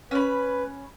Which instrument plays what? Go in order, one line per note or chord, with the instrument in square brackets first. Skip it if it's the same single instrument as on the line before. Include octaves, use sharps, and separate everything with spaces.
[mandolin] C#4 B5 [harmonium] B4